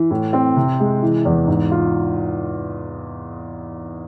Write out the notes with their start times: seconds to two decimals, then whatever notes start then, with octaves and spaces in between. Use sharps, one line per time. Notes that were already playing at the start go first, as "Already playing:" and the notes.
Already playing: E3
0.11 A2
0.33 C4
0.56 C3
0.80 G#3
1.02 E3
1.25 E2
1.47 G#2
1.71 F4